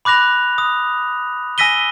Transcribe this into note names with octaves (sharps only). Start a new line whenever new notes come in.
B5 D6 F#6 A#6 F7
D#6
G#5 E6 A#6 B6 D#7 G7